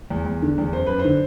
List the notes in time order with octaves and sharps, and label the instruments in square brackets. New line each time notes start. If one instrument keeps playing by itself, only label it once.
[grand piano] E2
E2
D3
E2
F#2 C5
F#2 B4
C5
D3